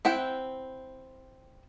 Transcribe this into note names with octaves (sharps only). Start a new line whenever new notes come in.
C4 E4 F#5 G5